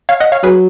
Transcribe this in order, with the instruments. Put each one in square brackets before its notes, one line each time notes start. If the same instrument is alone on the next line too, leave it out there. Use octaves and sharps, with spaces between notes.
[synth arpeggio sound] C#5 F5
D#5 F#5
C#5 F5
[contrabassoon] F#3 [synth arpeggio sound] G#4 B4